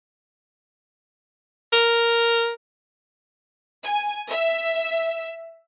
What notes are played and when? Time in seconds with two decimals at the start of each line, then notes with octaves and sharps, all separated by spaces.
1.73 A#4
3.83 G#5
4.29 E5